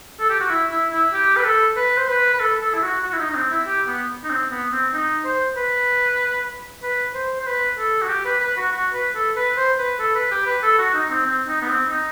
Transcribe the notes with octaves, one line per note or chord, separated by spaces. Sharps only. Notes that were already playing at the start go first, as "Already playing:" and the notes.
A4
G4
F#4
E4
E4
E4
G4
B4
A4
B4
C5
B4
B4
A4
A4
E4
F#4
F#4
E4
D#4
D#4
C4
E4
G4
B3
D#4
C4
B3
C4
D#4
C5
B4
B4
C5
C5
B4
A4
F#4
G4
B4
B4
F#4
F#4
B4
A4
B4
C5
B4
A4
B4
G4
B4
A4
F#4
D#4
C4
C4
D#4
B3
C4
D#4